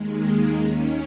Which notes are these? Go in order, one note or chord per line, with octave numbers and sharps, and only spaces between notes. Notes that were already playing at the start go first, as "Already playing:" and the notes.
Already playing: D#2 D#3 G#3
A#3
D#2 D#3 C#4